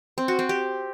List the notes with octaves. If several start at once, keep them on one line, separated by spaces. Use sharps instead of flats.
C4
F#4
C4
G4